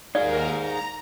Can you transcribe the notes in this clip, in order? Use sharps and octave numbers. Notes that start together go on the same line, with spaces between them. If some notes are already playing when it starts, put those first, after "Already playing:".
D#2 D#4 G#4 A#4 D5 F5 G#6
A#5